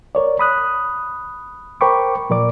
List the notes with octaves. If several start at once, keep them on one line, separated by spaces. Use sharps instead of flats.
A#4 C#5 D5
B5 D#6 F#6
A#4 C5 G5 B5 C#6 D6
A#2 F3 A#4 D5 D6